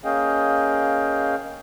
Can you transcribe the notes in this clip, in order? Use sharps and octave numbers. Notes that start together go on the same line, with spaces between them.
A#3 C#4 G#4 D#5 F5 G5